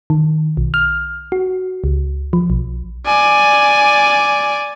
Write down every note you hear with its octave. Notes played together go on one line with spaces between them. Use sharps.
D#3
B1
F6
F#4
C#2
F3
B1
D5 G#5